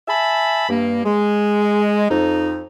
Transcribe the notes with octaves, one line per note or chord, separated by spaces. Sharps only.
E5 G#5 A5 B5
G2 A#3
G#3
F2 D#4